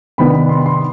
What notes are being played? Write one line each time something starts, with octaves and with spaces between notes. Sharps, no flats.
C3 D#3 B3 D4 B5
B5
C6
B5
C6